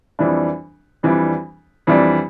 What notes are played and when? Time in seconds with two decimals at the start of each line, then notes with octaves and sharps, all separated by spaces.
0.19 F2 E3 G3 D4
1.03 F2 E3 G3 D4
1.87 F2 E3 G3 D4